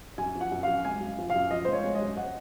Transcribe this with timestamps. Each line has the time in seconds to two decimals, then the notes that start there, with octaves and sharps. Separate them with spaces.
0.18 F#2 G#5
0.35 F3
0.41 F#5
0.52 F#2
0.63 F#2 F5
0.85 G#3 G#5
1.01 F#2
1.19 F3
1.30 F#2 F5
1.51 F3 D#5
1.65 C5
1.68 G#3 C#5
1.84 G#3
1.95 D#5
2.01 F#2
2.17 F#5